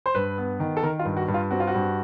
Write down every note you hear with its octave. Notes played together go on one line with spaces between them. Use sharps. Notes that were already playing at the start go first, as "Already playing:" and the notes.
C5
G2 B4
B3
D#3
A4
D#3 A#4
F4
G2
F#4
G2
F4
C4 F#4
F4
F#4
G2